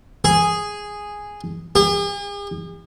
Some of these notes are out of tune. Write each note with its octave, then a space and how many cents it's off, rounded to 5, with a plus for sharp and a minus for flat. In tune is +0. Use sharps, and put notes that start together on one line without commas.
G#4 -5
G#4 -45